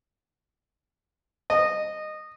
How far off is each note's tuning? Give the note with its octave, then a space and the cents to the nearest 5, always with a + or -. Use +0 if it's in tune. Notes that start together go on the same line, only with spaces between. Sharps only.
D#5 -15